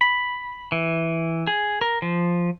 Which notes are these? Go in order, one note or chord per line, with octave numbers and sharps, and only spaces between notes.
B5
E3
G#4
A#4
F3